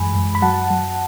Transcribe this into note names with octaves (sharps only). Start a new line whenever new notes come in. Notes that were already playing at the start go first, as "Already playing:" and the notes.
Already playing: F#2 E3 G#3 G#5 B5
F#2
B5
F#3 F#5 A5
F#3